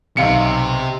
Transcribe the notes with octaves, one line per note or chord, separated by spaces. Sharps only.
B1 C3 F5 C#7